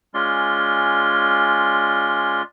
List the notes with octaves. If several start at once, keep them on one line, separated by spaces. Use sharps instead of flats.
G#3 C#4 F4 D5 C6